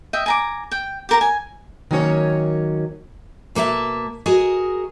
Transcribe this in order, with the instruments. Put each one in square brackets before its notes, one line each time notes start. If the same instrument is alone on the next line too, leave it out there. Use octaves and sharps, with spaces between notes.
[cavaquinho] D#5 E5 G5
G#5 A#5 D6
G5
G4 A#4 A#5
G#5
[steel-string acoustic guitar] D#3 F#3 A#3 C#4 C#5
B2 A#3 G#4 C5 E5 A5
F#4 G#4 A#4 D#5